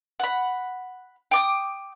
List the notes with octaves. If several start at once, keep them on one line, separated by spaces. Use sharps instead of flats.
F#5 B5
G5 D6 D#6